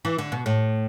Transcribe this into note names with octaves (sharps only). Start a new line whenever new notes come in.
E3
D3
B2
A2